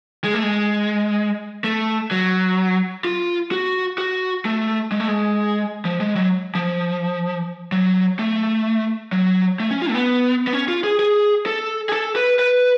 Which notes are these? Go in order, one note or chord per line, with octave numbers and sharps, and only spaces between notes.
G#3
A3
G#3
A3
F#3
F4
F#4
F#4
A3
G#3
A3
G#3
F3
G#3
F#3
F3
F#3
A3
F#3
A3
C#4
F4
A3
B3
B3
C#4
F4
G#4
G#4
A4
G#4
A4
B4
B4